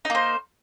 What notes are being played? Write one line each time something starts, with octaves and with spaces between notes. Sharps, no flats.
A#3 D#4 C5